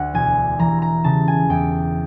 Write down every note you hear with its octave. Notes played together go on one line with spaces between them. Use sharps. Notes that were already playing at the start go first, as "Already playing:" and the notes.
Already playing: D2 F#5
E1 G#5
E3 A#5
A#5
C#3 A5
G#5
E2 G5